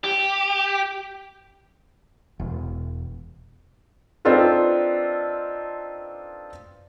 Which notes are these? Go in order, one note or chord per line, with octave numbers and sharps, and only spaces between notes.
G4
E1
C4 D4 D#4 F4 A4 B4